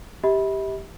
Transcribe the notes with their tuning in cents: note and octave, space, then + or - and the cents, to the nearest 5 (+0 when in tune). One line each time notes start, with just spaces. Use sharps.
G4 +0 E5 -45 B5 -10